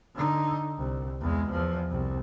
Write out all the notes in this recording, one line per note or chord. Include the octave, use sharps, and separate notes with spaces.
D3 D#4
C2
E2 G#3
E2 F3
C2